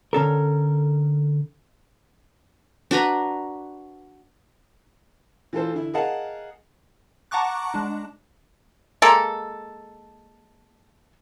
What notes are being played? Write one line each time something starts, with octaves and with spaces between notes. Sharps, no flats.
D3 C#4 A4 A#4
D4 F#4 B4 A#5
E3 F4 A4 C5
D3 E4
G#4 A#4 D#5 F5 F#5 A5
F#5 A5 A#5 C#6 D6 F#6
G#3 D4
G#3 A#3 A4